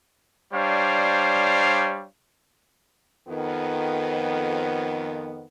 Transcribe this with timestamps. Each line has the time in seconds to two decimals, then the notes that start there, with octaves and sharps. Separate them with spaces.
0.52 G3 D4 C5 C#5 F5
3.28 F2 D#3 B3